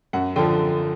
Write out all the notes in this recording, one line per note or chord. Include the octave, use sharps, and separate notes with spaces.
F#2 F#5
D3 F3 G5